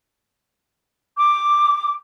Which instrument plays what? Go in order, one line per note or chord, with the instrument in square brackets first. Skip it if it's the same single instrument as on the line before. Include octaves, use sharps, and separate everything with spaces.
[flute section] D6